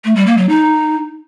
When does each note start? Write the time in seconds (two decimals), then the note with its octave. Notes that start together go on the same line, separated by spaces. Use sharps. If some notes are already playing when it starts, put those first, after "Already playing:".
0.05 A3
0.16 G3
0.27 A#3
0.38 F#3
0.49 D#4